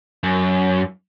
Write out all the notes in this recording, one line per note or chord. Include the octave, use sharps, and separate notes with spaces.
F#2